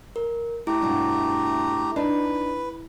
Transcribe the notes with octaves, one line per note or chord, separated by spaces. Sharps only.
A#4
A3 E4 G4 A#5
G2 B2
D4 D#4 B4